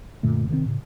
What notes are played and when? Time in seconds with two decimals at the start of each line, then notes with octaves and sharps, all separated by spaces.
0.23 F#2 A#2 D3 A3
0.49 C3 D#3 F3 C4
0.66 A2 C#3